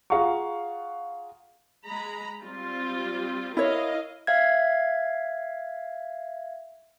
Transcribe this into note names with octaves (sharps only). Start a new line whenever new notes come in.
F4 G#4 F5 F#5 A#5 C#6
G#3 A#5 B5
G3 C4 F4
E4 A#4 C#5 D#5 F5
E5 F5 G#6